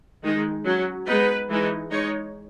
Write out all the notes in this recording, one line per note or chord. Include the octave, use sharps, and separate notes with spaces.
D#3 G#3 D#4
F#3 C#4
G#3 B3 D#4 B4
E3 G#3 D#4
G#3 D#4 C#5